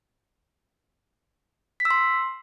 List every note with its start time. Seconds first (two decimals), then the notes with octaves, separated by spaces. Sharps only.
1.80 B6
1.85 E6
1.91 C6